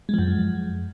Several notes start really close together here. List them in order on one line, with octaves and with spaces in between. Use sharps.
G#3 F3 F#2